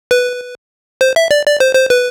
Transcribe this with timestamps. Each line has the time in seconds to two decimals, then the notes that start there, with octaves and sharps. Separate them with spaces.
0.11 B4
1.01 C5
1.16 E5
1.31 D5
1.46 D5
1.60 C5
1.75 C5
1.90 B4